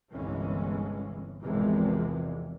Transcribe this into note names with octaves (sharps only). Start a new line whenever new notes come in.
G1 C2 E3 G#3 C#4
G#1 E2 C3 E3 F3 G#3